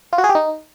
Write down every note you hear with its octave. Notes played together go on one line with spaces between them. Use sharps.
F4
F#4
G#4
G4
D#4